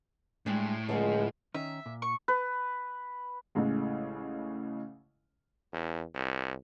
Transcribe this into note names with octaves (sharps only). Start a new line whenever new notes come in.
A2 G3 G#3 D4
C#2 D3 F3 G#3
D#3 C#4 D#4 E5
A#2
C#6
B4
A1 A2 C#3 G#3
E2
C2